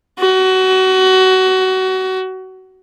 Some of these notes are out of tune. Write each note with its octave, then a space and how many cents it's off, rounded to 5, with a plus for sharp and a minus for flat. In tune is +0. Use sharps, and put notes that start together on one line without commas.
F#4 +25